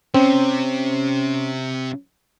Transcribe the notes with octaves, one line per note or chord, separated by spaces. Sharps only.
C3 C4 C#4